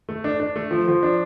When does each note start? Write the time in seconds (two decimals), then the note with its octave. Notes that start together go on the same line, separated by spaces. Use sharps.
0.09 A3
0.24 D4
0.40 D4
0.56 A3
0.71 F3
0.88 F3
1.03 D4